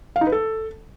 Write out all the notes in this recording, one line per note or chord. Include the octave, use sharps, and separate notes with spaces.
F5
D#4
B4
A4